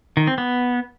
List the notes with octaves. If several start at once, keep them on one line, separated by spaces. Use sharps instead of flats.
D#3
C4
B3